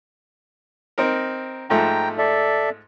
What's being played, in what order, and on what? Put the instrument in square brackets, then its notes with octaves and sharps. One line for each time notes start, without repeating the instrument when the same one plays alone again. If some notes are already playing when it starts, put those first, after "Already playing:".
[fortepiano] C4 D#4 A#4
[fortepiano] G#2 F3 A3 [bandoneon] G5 A#5
[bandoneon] A4 D5 E5